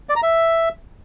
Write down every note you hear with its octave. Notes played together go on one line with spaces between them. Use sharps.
D5
A#5
E5